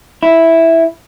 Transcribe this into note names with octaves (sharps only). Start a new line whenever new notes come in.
E4